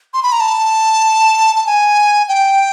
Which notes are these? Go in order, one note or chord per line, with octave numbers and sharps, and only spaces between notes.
C6
B5
A#5
A5
A5
G#5
G5